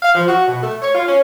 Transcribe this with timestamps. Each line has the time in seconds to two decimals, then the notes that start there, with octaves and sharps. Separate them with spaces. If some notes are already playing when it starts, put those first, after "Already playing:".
0.03 F5
0.15 F3
0.29 F#4
0.48 B2
0.62 A3
0.82 C#5
0.94 F4
1.08 C#4